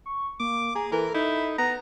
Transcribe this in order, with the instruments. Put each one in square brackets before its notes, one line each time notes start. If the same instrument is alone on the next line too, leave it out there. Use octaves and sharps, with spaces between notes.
[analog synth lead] C#6
[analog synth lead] A#3 [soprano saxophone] D6
[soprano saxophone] G#4 [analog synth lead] A#5
[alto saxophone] E3 [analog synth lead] A4 [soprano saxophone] A#4
[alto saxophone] D#4 [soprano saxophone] E4
[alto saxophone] B3 [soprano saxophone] A#5